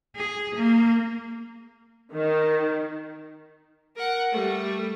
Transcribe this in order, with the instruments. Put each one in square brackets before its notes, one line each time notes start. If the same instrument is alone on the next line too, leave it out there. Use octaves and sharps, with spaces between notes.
[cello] G#4
A#3
[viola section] D#3
[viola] A#4 F#5
G3 A3